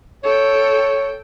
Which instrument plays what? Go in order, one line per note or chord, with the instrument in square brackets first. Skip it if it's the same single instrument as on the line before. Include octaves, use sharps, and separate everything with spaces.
[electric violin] A4 G5 [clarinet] C#5